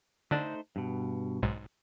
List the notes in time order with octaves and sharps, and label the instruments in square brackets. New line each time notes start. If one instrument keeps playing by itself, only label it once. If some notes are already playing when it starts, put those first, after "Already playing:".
[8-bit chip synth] D3 D4 [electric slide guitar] A3 D#4 C5
[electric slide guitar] G2 B2
[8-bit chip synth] B1 G#2